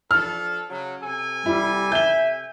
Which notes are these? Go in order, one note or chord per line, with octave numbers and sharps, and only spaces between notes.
F3 D4 A4 F6
C#3 F#3
C3 A4 G#5
G3 E4
E5 G6 G7